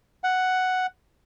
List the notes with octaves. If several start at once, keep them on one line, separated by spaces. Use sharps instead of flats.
F#5